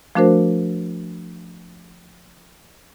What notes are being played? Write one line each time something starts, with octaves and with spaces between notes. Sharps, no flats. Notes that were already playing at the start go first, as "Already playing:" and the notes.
F3 A3 D4 F#4 A#4 C5